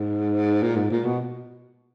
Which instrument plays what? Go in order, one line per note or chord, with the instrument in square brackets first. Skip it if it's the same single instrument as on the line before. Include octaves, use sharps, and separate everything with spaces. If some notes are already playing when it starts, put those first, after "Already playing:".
Already playing: [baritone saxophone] G#2
A#2
G#2
A#2
B2